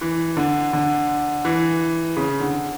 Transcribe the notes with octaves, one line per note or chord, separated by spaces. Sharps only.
E3
D3
D3
E3
C#3
D3